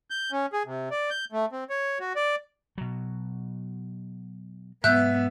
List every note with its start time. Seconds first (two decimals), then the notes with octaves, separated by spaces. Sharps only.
0.10 G6
0.32 C#4
0.53 G#4
0.66 C3
0.91 D5
1.11 G6
1.32 A3
1.52 C4
1.70 C#5
2.00 F#4
2.16 D5
2.78 B2 F#3
4.84 G#2 F#3 B3 E5 F#6 G6